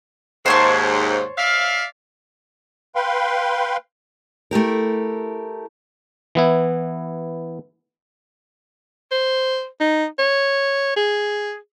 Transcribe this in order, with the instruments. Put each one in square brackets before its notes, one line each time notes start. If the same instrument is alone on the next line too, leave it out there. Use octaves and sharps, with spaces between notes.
[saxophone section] D#2 G#2 [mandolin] C5 C#5 A5
[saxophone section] D5 E5 F5
[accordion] B4 F5 G5 B5 C6
[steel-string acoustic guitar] A3 E4 G4 A#4
[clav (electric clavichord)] E3 B3 E4
[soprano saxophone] C5
D#4
C#5
G#4